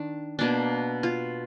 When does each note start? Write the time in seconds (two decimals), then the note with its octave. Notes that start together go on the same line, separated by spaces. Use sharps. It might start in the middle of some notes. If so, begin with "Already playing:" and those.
Already playing: D#3 D4
0.39 B2 A#3 D4
1.03 F4